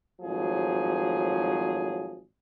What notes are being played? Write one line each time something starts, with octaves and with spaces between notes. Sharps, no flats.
G#1 A2 F3 F#3 G#4